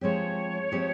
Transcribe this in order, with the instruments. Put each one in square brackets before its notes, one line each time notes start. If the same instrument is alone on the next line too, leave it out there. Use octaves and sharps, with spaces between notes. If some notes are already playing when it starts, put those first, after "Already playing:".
[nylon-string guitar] F3 G#3 C4 G4 [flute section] C#5
[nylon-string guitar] F3 G#3 C4 G4